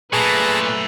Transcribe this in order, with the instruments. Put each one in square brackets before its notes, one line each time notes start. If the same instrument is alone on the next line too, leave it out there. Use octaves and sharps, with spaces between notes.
[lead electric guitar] F#2 A3 [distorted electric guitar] A#2 [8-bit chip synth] G#4 A5 A#5 [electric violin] B4